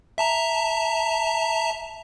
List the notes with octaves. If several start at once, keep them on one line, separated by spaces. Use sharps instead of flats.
E5 A5 A#5